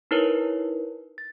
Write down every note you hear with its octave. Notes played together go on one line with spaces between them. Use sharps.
D#4 E4 A#4 B4 C#5
A6